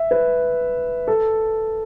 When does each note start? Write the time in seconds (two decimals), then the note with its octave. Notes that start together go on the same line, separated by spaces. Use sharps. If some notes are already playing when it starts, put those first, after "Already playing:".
Already playing: E5
0.11 B4
1.08 A4